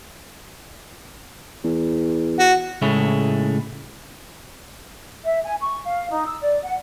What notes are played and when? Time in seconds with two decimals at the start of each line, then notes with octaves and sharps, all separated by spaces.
1.64 E2
2.39 F#4
2.82 A2 C#3 G#3 A3 C#4 E4
5.24 E5
5.44 G#5
5.61 C#6
5.84 F5
6.10 D#4
6.26 E6
6.40 D5
6.63 F#5